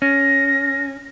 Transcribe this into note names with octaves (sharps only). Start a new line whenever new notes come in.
C#4 A#6